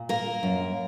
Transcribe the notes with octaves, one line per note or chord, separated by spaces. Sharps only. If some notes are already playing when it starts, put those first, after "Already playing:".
Already playing: A#2
A#3 A#4
F#2